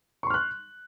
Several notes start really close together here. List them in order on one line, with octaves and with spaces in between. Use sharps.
C#6 C6 F6 F#6